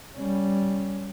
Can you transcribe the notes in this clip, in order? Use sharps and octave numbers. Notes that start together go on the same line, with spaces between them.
G3 C#4